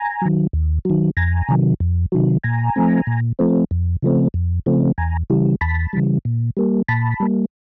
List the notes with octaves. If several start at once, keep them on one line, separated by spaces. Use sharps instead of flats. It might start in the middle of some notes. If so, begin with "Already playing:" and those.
Already playing: G#5 A#5
D#3 F#3
D#2
D#3 F#3
F2 G#5 A#5
C3 D#3 F#3
F2
C3 D#3 F#3
A#2 G#5 A#5
F3 A3 C4
A#2
F3 A3 C4
F2
C#3 F3 A3 C4
F2
C#3 F3 A3 C4
E2 G#5 A#5
C#3 E3 G3
E2 A5 B5
C#3 E3 G3
A#2
G3 A#3
A#2 A5 B5
G3 A#3